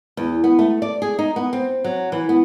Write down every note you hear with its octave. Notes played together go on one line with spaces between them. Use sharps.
E2
B3
A3
D5
G#4
D#4
B3
C4
F#3
E3
B3